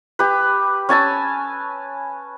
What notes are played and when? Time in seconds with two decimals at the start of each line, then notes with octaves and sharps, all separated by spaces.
0.19 G4 B4
0.89 C#4 G#5 A5 E6